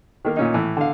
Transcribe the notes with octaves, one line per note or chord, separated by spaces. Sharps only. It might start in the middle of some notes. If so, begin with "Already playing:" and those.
D#3 A#3
A#2 C#4 D#4
A2 E3
D3 F5